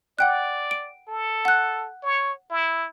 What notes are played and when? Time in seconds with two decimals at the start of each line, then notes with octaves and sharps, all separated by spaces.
0.19 D5 F#5 G5 F#6
0.71 D7
1.08 A4
1.45 F#5 F#6
2.02 C#5
2.50 E4